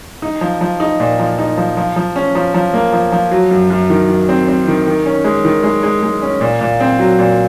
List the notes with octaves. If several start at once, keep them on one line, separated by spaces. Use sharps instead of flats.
D#4
F3
F3
D#4
A#2
F3
D#4
F3
F3
F3
C#4
F3
F3
A#3
F3
F3
F#3
F#2
F#2
D#3
D#3
C4
C4
D#3
D#3
C#4
G#3
D#3
G#3
G#3
G#3
C#4
A#2
A#2
C4
F#3
A#2